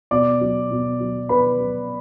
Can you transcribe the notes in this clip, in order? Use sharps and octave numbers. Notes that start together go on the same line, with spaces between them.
B2 D5 D6
F#3
B2
F#3
B2 B4 B5
F#3